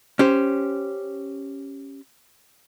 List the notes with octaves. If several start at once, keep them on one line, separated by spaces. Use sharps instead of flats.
C#4 G4 C5